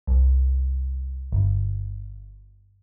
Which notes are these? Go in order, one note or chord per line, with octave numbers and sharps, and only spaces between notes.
C2
G1